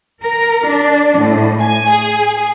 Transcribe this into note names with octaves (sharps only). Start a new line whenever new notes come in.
A#4
D4
A2
G#5
G#4